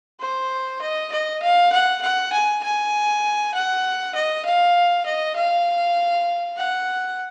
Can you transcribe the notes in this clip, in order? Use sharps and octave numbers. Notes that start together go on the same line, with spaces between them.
C5
D#5
D#5
F5
F#5
F#5
G#5
G#5
F#5
D#5
F5
D#5
F5
F#5